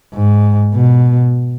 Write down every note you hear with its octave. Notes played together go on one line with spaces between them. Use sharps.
G#2
B2